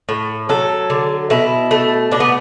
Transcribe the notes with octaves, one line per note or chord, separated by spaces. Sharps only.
A2
F#3 A4
D3
B2 E4
A3
B2 D4
B3